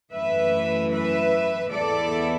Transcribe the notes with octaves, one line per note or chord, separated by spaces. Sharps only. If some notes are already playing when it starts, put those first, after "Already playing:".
F#2 E3 A3 B4 E5
B4 E5
E2 E3 B3 E4 A4 D5